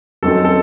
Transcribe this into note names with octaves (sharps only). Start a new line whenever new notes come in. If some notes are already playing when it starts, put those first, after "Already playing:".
F#2 F#3 C4 D#4 A4
A4